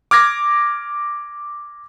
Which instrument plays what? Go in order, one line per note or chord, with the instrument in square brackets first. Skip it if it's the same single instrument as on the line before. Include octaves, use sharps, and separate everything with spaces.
[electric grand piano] D6 F6 G#6 A#6